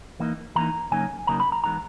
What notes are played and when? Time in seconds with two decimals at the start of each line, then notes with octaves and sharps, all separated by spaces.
0.20 E3 A#3 D#4
0.56 E3 A#3 D#4 A#5
0.91 C#3 F#3 A#3 D#4 G#5
1.27 C#3 F#3 A#3 D#4 A#5
1.40 B5
1.52 A#5
1.64 E3 G#3 B3 D#4 A#5